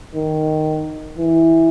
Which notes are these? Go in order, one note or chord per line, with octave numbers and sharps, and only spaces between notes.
D#3
E3